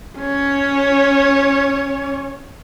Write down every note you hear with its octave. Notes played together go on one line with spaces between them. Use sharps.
C#4 C#5